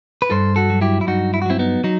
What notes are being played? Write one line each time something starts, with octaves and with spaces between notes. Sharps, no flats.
B4
G2 A4 C5
F#4 A4
F#3
E4 G4
E4
G2 D#4 F#4
E4
F#4
F#3 C4 E4
B3 D#4
F#3 D#4